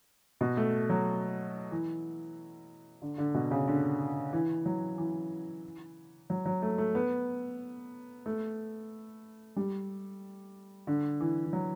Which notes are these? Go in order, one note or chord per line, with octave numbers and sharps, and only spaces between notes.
B2
A3
F#3
E3
D3
D3
B2
C#3
D3
E3
F#3
E3
F#3
F#3
A3
A3
B3
A3
G3
D3
E3
E3
F#3